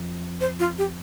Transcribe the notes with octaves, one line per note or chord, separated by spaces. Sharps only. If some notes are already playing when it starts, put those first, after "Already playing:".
Already playing: F2
C5
F4
G4